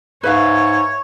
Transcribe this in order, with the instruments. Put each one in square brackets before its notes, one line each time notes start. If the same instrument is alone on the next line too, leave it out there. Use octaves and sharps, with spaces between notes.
[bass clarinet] G#2 [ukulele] B4 E5 F5 [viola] C#5